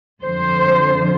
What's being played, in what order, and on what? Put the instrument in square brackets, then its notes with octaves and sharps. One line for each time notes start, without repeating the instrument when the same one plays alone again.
[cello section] F2 D3 F3 C5